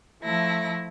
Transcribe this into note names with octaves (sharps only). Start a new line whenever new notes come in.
F3 A3 E4 A#6